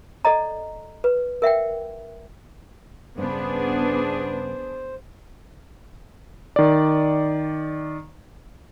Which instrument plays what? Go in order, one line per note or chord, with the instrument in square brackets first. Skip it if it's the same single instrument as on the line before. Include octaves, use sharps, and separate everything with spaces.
[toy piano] A4 D5 D#5 A#5
B4
A#4 E5 F#5 G5
[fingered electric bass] G2 C#3 [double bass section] B3 [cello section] D4 G#4 [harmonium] C5
[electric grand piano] D#3 D5